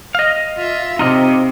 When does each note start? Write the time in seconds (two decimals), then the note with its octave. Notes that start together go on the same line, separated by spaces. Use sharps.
0.15 D#5 F5
0.58 F4 E5
0.99 C3 D#4 F4 D#5